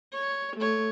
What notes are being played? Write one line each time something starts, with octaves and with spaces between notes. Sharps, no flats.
C#5
A3 C#5